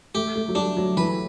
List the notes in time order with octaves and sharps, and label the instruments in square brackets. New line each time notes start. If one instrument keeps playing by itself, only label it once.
[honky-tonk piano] A3 [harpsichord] G4
[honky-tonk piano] A3
F#3
[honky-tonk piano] G3 [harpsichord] D4
[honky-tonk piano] F#3
[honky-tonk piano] E3 [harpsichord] B4